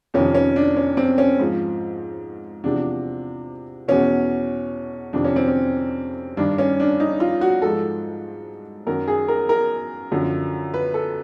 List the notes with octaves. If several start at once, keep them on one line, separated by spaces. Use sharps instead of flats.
F2 C3 D#3 C#4
C#4
D4
C#4
C4
C#4
G#2 F3
E2 C3 F3 D4
E2 B2 C#4
F2 C3 D#3 D4
C#4
C4
C#4
G2 D#3 D4
C#4
D4
D#4
F4
F#4
G#2 F3 A4
F#2 D#3 A#4
G#4
A#4
A#4
F#2 D3 F3
B4
A4